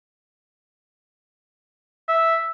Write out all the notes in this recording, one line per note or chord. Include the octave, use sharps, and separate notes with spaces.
E5